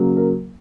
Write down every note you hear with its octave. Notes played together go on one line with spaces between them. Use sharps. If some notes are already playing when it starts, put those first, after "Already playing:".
Already playing: C#3 F#3 A#3
A#4